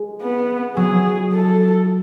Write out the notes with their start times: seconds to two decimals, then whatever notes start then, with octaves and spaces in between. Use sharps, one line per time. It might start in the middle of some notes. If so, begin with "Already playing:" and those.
Already playing: G#3
0.22 B3
0.77 F#3 G#4
1.33 A4